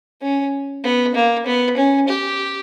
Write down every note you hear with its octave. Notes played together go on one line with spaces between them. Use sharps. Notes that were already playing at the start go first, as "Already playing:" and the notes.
C#4
B3
A#3
B3
C#4
G4